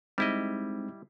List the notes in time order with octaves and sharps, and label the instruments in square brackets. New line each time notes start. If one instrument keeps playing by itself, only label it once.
[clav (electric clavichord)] G3 E4 D#5 [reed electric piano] G#3 C4 D#4